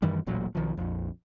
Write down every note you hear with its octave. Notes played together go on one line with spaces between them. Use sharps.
F#2 D#3 E3 G3
D#1 A1 A#2 F#3
B1 D#3 F3
A#1 F2